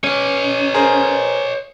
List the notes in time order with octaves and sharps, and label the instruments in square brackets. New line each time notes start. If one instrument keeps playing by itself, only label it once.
[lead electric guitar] C#4 [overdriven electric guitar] B4 C#5
[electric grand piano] G#4 A#4 C5